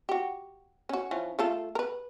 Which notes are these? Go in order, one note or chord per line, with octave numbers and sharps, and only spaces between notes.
F#4 G4
C#4 F#4
E3 F3 C#4
A3 F4 A4
A#4 B4